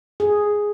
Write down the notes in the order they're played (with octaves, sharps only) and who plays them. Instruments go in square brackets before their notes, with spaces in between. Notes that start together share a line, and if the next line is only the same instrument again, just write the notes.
[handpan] G#4